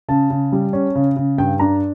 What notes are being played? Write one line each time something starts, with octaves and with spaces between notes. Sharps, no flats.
C#3 A5
C#3
G3
C#4
C#3
C#3
G2 G5
D4 A#5